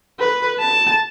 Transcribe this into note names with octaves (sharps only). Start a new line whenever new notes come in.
B4
A5